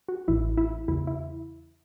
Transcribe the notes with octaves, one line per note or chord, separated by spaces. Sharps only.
F#4
A1 A2 E3 E4
E4
E2 C#3 E3 E4
E4